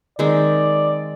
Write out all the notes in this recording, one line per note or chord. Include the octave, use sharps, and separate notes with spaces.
D#3 G#3 C4 D5